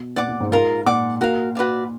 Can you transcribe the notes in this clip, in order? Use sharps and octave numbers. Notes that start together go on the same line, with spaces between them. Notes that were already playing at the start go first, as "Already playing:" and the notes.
Already playing: B2
A#2 D5 F#5 D6
A#2
G#2
G#2 F4 A#4 F5 A#5
A#2 D5 F#5 D6
A#2 F#4 A#4 F5
F#4 B4 D5 F5